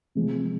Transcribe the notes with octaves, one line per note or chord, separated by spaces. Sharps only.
C3 F3 G#3